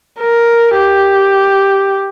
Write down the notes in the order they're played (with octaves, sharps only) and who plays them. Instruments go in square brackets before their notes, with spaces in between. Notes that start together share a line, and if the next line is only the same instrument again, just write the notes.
[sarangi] A#4
G4